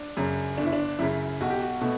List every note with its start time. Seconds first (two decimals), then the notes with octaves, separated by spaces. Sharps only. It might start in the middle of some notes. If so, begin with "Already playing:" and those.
Already playing: D4
0.17 F#2 C#3
0.58 G1 D4
0.65 E4
0.73 D4
0.99 F#2 C#3 E4
1.41 B1 F#4
1.50 G4
1.61 F#4
1.81 B2 A3